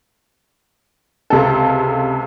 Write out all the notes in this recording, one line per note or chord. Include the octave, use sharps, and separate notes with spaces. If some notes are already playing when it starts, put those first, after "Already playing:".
C#2 C3 A4